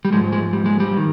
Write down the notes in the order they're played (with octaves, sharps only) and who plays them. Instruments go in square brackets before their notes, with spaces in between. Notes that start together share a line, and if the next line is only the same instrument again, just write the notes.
[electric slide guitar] G3
G#2 F3 G#3
G#3
G3
G#3
G3
D#3